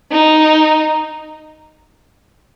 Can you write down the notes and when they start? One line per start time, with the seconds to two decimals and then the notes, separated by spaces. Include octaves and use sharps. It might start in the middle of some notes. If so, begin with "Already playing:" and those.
0.12 D#4